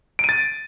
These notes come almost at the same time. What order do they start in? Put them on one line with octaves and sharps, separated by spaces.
D7 D#7 A6